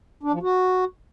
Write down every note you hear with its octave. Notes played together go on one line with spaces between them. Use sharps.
D4
F3
F#4